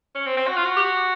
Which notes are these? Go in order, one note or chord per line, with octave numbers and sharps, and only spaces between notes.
C#4
C4
C4
F#4
F4
F#4
G4
F#4